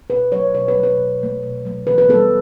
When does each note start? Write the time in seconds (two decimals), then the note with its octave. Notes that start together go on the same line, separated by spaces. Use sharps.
0.10 B2 B4
0.32 F#3 A3 C#5
0.54 B2 C#5
0.68 B4
0.76 F#3 A3
0.83 B4
0.98 B2
1.21 F#3 A3
1.43 B2
1.65 F#3 A3
1.87 E3 B4
1.98 B4
2.09 G3 B3 A4